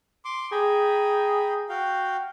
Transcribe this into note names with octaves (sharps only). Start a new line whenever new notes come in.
C6 D6
G#4 G5 A#5 B5
F#4 F5 G5